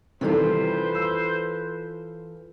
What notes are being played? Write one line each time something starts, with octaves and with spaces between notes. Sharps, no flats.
C3 D#3 E3 G3 F4 A4 B4 C5
E6